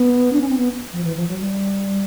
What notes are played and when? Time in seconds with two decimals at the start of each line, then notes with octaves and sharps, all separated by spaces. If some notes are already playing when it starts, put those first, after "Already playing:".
Already playing: B3
0.33 D4
0.41 C#4
0.49 C4
0.57 B3
0.93 F3
1.04 E3
1.16 F3
1.28 F#3
1.39 G3